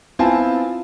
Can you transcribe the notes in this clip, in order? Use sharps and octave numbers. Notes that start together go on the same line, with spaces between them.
B3 C4 E4 F4 G#5 A5